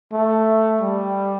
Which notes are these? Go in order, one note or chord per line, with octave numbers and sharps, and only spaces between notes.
A3
G3